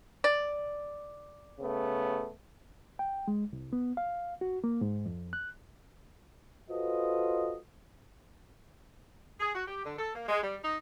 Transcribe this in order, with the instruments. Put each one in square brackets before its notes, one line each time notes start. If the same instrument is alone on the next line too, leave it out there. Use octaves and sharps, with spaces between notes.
[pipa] D5
[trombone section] C#3 A3 B3
[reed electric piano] G5
G#3
C2
B3
F5
F#4
A#3
G#2
F2
F#6
[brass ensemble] F4 F#4 A4 B4 C5 D#5
[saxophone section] G#4
F#4
G4
D3
A4
A#3
G#3
G3
D#4